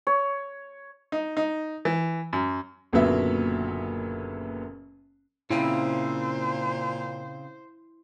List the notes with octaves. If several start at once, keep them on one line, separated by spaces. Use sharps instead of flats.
C#5
D#4
D#4
E3
F#2
F#1 A#2 D3 F#3 B3 E5
A#2 C#3 C4 E4 C5